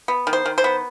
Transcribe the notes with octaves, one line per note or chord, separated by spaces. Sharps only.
B3
D#3
C5
D#3
C5
B3